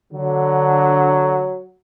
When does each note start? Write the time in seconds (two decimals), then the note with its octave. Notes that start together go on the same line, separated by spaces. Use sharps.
0.13 D3 F#3